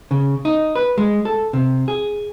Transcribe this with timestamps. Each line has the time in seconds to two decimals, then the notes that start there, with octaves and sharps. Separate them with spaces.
0.11 C#3
0.45 D#4
0.75 B4
0.98 G#3
1.25 A4
1.53 C3
1.88 G#4